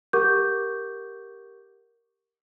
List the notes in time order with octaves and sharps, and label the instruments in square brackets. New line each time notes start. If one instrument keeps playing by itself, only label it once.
[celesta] G4 A#4 F#5 C#6 D6 G6